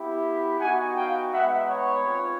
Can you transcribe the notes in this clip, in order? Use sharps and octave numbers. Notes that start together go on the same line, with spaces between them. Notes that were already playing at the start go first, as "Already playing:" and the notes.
Already playing: B3 E4 G4
B3 D#4 F#4 F#5 G#5
F5 G5
G#3 B3 D#4 E5 F#5
B4 C#5
C4 F4